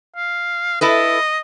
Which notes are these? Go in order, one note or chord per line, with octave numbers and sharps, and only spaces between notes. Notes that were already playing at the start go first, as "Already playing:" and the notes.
F5
E4 A4 B4 D#5